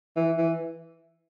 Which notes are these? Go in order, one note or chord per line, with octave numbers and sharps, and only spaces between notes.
E3
E3